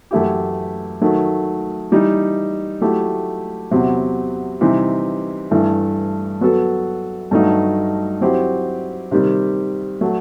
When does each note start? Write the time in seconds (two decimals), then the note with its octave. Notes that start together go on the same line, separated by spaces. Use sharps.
0.11 F#2 E3 A3 E4 G4
1.01 D#3 F#3 A3
1.92 E3 G3 D#4
2.81 F#3 A3 E4 G4
3.71 E2 C3 F#3
4.61 C3 E3 G3 D#4
5.51 G2 E3 A3
6.41 F#3 B3 F#4 A4
7.31 G2 F#3 A3 D#4
8.21 F#3 C4 E4 G4
9.11 C3 D#3 G3
10.01 F#3 A3